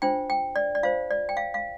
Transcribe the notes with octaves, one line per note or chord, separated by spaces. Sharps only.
D4 F4 C5 G5
G5
D5
D5
F4 C5 F5
D5
G5
F5
F5